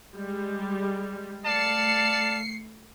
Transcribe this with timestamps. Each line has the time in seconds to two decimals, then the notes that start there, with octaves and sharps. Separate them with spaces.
0.14 G3 G#3
1.45 A3 D5 F5 A5 C7 C#7